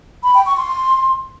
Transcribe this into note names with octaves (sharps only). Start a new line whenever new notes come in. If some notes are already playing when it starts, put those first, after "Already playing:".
B5
G5
C#6
C6